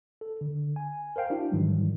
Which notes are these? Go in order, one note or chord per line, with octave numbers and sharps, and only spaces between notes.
A4
D3
G#5
A#4 C5 F5 G5
D4 E4 F#4
G#2 D#3 E3 F#3 G3